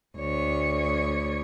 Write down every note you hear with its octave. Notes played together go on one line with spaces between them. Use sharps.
D2 C#5